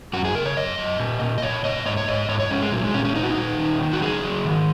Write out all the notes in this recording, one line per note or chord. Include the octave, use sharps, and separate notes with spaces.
F#2 F#4
G#4
C#3 A#4
C#5
F#2 D#5
F#2
A#2
A#2
D#5
A#2 C#5
A#2 D#5
G#2 C#5
C#5
G#2 D#5
G#2 C#5
C#5
G#2 C#4
G#3
A#2 F#3
G#3
A#2 C#4
C#4
A#2 D#4
F#4
D#4
A#2
D#3
D#3
F#4
F#3 G#4
F#3
D#3